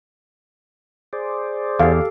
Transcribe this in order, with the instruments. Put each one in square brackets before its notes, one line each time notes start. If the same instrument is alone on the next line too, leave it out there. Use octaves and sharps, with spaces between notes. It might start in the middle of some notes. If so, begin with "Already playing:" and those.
[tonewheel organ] G#4 C5 D5
[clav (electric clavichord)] E2 [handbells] G4 A4 [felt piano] F5